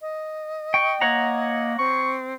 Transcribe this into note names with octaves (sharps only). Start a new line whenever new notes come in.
D#5
G5 C#6
A#3 C#5 F#5 A#5
C4 C#6